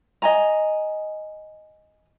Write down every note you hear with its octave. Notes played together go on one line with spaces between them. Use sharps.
D#5 G#5 A#5